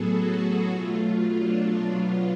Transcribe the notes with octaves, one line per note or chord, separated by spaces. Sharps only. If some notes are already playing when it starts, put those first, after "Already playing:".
Already playing: A2 F#3 B3 G#4 A4
F#4
B2 F#3 A3 F4
D4
B2 F#3 B3 F4